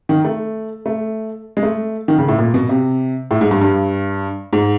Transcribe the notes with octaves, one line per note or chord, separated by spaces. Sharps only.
D#3
A3
A3
G#3
A3
D#3
C#3
A2
A#2
B2
C3
A2
G#2
G2
G2
G#2